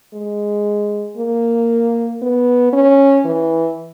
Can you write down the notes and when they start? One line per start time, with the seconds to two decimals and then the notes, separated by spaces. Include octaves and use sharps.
0.13 G#3
1.17 A#3
2.22 B3
2.73 C#4
3.25 E3